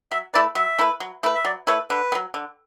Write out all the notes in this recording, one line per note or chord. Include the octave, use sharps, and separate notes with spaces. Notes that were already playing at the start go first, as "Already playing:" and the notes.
F#3 E5
A3 E4 B4 D5
F#3 E5
A3 E4 B4
F#3
A3 E4 B4
E5
F#3 D5
A3 E4 B4 C#5
D3 B4
B3
F#3
D3